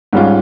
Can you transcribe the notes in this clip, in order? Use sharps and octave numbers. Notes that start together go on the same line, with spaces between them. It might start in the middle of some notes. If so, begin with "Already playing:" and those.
G#2 G3 C#4 F4